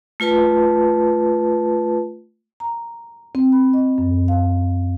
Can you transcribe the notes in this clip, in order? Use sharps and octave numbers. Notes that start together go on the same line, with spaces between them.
A3 F4 B4 A5
A#5
C4
B5
D#5
F#2
F5